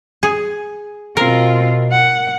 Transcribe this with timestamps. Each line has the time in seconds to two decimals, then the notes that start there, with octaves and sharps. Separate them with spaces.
0.23 G#4
1.17 B2 C4 F4 A#4
1.92 F#5